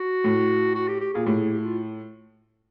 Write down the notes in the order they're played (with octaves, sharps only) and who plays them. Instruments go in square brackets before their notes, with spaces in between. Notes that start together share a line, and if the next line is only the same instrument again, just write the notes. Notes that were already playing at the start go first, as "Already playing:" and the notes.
Already playing: [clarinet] F#4
[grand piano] A2
[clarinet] F#4
G4
G4
[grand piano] A#2 [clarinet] G#4
[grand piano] A2 [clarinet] G4
[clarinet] G#4
G4
E4
F4